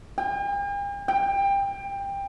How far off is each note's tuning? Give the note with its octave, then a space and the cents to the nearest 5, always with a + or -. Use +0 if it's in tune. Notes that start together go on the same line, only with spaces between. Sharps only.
G5 +45
G5 +20